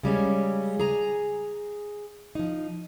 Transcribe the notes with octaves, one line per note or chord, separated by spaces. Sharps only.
C#3 G3 G#3 C#4
G#4 G#5 A#5
F3 D#4